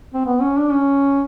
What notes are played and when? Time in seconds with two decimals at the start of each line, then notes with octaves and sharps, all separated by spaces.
0.14 C4
0.25 B3
0.41 C#4
0.57 D4
0.72 C#4